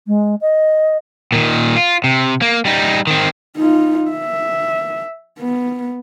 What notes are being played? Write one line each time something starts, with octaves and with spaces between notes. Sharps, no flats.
G#3
D#5
A#2 D#3
F4
C3
A#3
G3 D#4
D#3 C4
D#4 F4
E5
B3